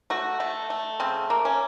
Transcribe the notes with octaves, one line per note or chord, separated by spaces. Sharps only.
A3 F#4
A3
A3
C#3 C4
A#3
C#4